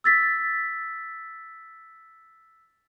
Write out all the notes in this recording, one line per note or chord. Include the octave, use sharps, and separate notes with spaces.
E6 A6 B6